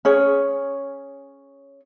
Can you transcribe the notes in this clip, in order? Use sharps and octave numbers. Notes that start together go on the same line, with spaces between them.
C#4 G#4 C#5